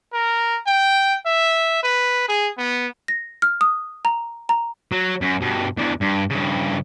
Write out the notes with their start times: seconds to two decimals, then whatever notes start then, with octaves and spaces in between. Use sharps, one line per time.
0.13 A#4
0.67 G5
1.26 E5
1.83 B4
2.28 G#4
2.58 B3
3.08 A#6
3.42 F6
3.61 D#6
4.05 A#5
4.49 A#5
4.92 F#3
5.21 F#2
5.41 G2 B2
5.78 E2 D3
6.01 G2
6.30 G2 C#3